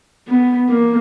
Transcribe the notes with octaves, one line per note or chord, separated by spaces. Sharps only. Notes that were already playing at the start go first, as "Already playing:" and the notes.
B3
A#3